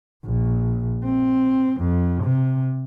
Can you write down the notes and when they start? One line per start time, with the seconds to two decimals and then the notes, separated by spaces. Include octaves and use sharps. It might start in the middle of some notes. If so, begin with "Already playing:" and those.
0.25 A#1
1.05 C4
1.81 F2
2.24 C3